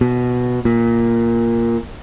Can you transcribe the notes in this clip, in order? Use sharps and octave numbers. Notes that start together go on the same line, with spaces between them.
B2
A#2